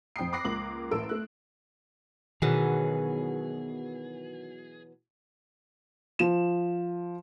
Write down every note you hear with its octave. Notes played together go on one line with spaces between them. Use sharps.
F2 G5 D#6 C7
B5 D6 F#6 A#6 C7
C#2 A#3 D6 F#7
A1 A4 A#4 E6 D7
A3 F#6
B2 D#3 E3 F#3 G#4
F3 E7